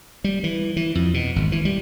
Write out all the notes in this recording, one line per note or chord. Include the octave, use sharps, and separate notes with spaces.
G3
E3
E3
F2
B2
G#1
E3
G3